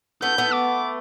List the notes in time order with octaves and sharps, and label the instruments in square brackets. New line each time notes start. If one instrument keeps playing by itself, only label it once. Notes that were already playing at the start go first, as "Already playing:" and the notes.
[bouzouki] A3 B3 [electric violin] G6
[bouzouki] A3 B3
[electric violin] D6